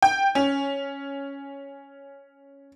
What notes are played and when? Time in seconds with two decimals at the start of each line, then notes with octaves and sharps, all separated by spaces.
0.02 G5
0.35 C#4